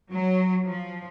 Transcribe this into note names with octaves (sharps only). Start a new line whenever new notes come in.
F#3
F3